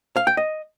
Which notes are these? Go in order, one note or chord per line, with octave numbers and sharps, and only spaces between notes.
F5
G5
D#5